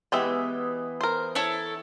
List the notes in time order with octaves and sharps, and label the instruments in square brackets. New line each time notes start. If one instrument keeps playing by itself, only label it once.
[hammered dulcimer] E3 B3 [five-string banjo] G#3 G4 E5
[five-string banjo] A#4 C5
[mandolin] E4 A4 C#5